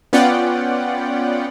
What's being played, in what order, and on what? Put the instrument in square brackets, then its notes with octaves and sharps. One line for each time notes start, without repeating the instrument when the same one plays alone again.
[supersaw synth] B3 C#4 F4 D5 F#5 G5